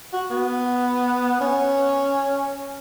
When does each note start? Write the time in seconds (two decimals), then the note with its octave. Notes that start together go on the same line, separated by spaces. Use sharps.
0.13 F#4
0.30 B3
1.41 C#4